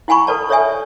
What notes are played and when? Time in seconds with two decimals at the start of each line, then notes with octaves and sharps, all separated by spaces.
0.08 E4 F#5 G#5 B5 C#6
0.27 A4 B4 D5 A5
0.49 A4 C#5 D5 E5 G#5